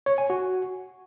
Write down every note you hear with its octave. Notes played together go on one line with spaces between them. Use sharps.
C#5
G#5
F#4